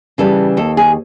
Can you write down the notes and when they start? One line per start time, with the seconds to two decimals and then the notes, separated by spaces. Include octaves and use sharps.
0.18 C#3 E3 G3 A4
0.57 D#2 A4
0.77 G#4